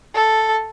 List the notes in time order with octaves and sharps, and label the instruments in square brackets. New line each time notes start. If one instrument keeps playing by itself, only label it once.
[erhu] A4